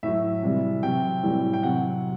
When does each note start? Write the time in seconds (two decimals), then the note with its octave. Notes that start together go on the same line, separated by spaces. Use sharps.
0.03 A2 F#3 E5
0.43 C3 E3 G3
0.83 C3 F#3 G5
1.23 A2 E3 G3
1.53 G5
1.63 C3 F#3 F#5